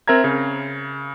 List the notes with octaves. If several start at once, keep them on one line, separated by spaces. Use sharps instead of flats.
C4 A#4 E5 A#5 G#6
C#3